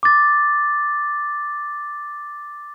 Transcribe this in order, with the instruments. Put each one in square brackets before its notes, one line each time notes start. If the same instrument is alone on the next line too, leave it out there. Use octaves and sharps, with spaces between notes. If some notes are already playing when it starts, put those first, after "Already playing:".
[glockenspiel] D6 A6